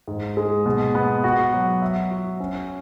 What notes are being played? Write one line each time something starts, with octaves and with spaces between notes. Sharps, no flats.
G#2
G#3
B2
B3
F#4
F#3
E5
F#4
C#4